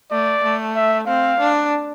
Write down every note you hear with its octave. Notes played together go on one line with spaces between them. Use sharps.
A3 D5
A3
E5
C4 F5
D4